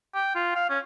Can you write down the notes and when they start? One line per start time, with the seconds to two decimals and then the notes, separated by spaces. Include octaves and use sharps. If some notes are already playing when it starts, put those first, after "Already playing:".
0.15 G5
0.35 F4
0.56 F5
0.70 C#4